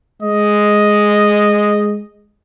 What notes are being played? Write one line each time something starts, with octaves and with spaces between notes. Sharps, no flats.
G#3 D#5